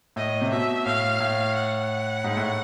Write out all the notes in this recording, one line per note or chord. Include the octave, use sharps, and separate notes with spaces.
A2 D#5
C3
B2 E5
A2 F5
A2
F#5
G#2
A2